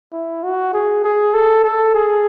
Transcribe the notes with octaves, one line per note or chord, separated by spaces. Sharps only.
E4
F#4
G#4
G#4
A4
A4
G#4